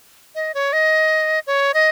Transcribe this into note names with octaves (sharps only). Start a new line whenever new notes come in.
D#5
C#5
D#5
C#5
D#5